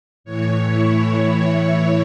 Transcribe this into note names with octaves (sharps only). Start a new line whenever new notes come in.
A2 E3 C#5
E4